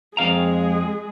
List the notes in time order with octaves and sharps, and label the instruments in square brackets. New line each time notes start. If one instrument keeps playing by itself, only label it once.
[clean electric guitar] F2 F5 A#5 [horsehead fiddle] G#3 G#4